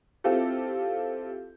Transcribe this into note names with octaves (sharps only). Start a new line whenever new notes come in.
C4 E4 F4 G4 A4